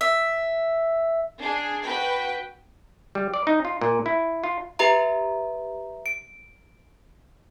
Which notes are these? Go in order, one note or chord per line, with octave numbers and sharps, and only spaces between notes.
E5
D4 G#4
F#4 B4 G5
G3
D5
D#4
F4
A#2
E4
F4
G4 B4 E5 A#5
D7